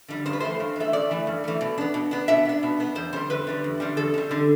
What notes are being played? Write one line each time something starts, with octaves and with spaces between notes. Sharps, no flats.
D3 G3
G2 C5
B4
E3 A3 C5
G2
E3 A3 E5
G2 D5
E3 A3
G2
E3 A3
B2
B3 D4
B2
B3 D4
B2 E5
B3 D4
B2
B3 D4
E2 C5
D3 G3 C5
E2 B4
D3 G3
E2
D3 G3
E2 A4
D3 G3
D3